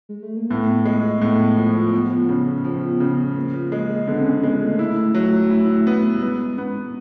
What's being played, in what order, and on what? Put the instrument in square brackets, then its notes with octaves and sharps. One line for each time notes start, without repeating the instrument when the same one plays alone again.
[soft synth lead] G#3
A3
A#3
[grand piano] A2 [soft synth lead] B3
[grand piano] G#3
A2
F3
F3
C#3
F3
C#3
[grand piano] F3 [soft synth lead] A#3
[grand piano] G#3
[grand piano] D3 [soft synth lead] B3
[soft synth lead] C4
C#4
[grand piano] G#3 [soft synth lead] B3
[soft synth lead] A3
[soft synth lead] A#3 [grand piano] E4
[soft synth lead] A3
[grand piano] F#3
E4
B3
[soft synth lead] G3
[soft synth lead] G#3 [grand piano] B3
[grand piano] B3